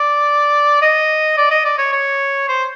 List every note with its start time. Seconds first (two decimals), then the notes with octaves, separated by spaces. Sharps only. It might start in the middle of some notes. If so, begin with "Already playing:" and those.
Already playing: D5
0.82 D#5
1.38 D5
1.51 D#5
1.65 D5
1.79 C#5
1.93 C#5
2.49 C5